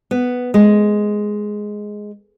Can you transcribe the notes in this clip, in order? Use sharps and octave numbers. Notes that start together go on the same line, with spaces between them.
B3
G#3